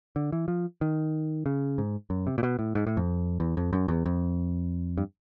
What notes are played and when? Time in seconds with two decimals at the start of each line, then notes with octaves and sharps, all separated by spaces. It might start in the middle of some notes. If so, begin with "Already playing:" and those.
0.16 D3
0.32 E3
0.48 F3
0.81 D#3
1.46 C#3
1.78 G#2
2.10 F#2
2.27 C3
2.38 A#2
2.43 B2
2.59 A2
2.75 G#2
2.87 A2
2.97 F2
3.40 E2
3.57 F2
3.73 F#2
3.88 E2
4.06 F2
4.98 G2